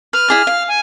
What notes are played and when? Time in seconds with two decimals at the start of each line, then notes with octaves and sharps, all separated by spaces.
0.13 B4 F6
0.28 E4 G#4 D5
0.47 F5
0.68 G#5